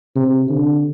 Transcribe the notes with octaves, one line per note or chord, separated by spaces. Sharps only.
C3
D3